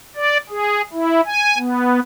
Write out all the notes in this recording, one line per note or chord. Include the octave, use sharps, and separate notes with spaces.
D5
G#4
E4
G#5
B3